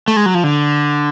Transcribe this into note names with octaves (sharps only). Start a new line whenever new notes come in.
A3
G#3
F#3
F3
D3